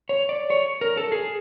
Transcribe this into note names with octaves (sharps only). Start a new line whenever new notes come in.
C#5
D5
C#5
A#4
A4
G#4